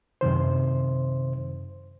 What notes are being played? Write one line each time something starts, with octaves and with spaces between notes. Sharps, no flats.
F#2 C3 D#3 C5